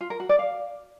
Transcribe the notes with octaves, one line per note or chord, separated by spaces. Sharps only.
F4
A#4
F#4
D5
F5